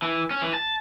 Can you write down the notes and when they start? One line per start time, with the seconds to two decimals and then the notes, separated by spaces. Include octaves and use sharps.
0.02 E3
0.31 C#4
0.42 E3
0.54 A5